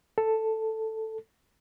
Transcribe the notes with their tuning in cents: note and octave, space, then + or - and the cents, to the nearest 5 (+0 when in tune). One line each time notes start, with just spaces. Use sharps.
A4 +5